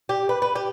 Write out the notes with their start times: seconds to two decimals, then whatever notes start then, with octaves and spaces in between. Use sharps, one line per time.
0.09 G4
0.29 B4
0.42 B4
0.55 G4